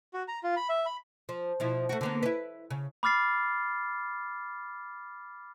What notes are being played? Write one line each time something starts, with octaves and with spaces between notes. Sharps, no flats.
F#4
A#5
F4
B5
E5
B5
F3
B2 F3 E4
A3 F#4
D3 A#3 B3
E4 B4
C#3
B5 D6 F6 A6 C7